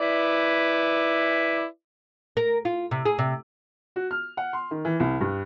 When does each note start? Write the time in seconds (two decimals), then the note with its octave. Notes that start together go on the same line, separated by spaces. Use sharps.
0.01 E4 B4 D5
2.37 A#4
2.65 F4
2.91 C3
3.05 G#4
3.19 C3
3.96 F#4
4.11 F6
4.37 F#5
4.53 C6
4.71 D#3
4.85 E3
5.00 C2
5.21 G2